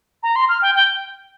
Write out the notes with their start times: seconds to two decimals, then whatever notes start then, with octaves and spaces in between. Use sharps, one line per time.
0.23 A#5
0.36 C6
0.49 F6
0.62 G5
0.75 G5